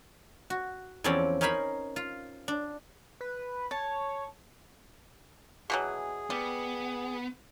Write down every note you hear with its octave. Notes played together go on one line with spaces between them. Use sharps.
F#4
E2 F3 C4 C#4 A4 D5
C#4 D#4 A#4 C5 G#5 B5
F4
D4
B4
C#5 A5
B2 E3 F#3 G#4
G3 B3